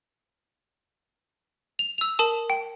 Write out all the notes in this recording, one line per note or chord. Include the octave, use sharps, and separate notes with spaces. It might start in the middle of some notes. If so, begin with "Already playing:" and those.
F7
E6 F7
A#4 A5 D#6
G5